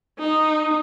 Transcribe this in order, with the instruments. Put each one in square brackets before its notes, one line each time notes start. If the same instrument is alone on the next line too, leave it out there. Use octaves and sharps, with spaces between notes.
[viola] D#4